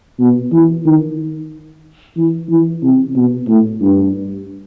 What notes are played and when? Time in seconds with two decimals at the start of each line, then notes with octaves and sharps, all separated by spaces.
0.19 B2
0.53 E3
0.86 D#3
2.16 E3
2.50 E3
2.83 C3
3.16 B2
3.48 A2
3.82 G2